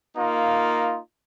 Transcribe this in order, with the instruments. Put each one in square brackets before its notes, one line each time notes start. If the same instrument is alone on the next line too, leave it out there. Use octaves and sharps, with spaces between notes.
[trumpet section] A#3 D#4 F4